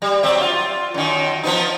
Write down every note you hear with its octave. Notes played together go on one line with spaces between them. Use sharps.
G3
F#3 C4 E5
F4
F#2 D#3
F3 B3 D#4